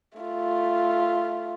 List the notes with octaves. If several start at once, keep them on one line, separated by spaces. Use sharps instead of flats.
A3 F4